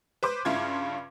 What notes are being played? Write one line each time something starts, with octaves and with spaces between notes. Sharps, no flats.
B4 C5 D6
G2 C#3 E4 F4 C6 G#6